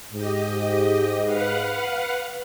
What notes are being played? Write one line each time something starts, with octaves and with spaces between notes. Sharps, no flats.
G#2 G4 D#5
B4 F5 F#5